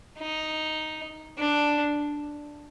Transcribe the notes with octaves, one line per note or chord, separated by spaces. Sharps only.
D#4
D4